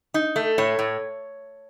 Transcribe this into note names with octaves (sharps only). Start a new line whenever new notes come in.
D#4
A3
A2 C#5
A2